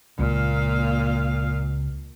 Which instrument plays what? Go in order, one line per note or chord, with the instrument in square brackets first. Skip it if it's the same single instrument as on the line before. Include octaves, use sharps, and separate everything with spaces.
[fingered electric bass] C#2 A#3 [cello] A#2 F5